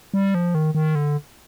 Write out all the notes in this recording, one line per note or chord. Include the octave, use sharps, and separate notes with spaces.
G3
F3
D#3
D#3
D3